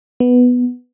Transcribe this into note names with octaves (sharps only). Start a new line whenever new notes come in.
B3